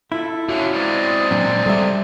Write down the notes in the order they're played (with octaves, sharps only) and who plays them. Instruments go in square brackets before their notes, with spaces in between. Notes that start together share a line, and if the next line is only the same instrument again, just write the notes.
[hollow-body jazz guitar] E4 F4 [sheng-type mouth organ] A4
[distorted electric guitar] D3 F#3 [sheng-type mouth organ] C#4 E5 F5 [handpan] F#4
[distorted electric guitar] C3 G#3 [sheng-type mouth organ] C4 D5
[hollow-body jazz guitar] A#2 F#3 D4
[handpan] G3 [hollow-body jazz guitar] A4 E5